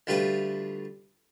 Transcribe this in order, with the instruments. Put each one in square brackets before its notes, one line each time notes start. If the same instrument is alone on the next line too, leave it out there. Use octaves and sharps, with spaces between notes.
[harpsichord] D2 G3 A3 F4 B4 F5